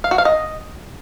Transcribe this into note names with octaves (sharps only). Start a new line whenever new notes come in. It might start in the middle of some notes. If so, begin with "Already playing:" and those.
F5
F#4
F5
D#5